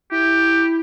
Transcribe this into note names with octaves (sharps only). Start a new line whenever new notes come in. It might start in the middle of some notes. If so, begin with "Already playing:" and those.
E4 G4